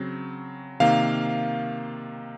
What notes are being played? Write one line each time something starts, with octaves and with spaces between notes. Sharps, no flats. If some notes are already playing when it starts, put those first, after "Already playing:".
Already playing: C#3 F#3 C4
C3 D#3 A#3 F5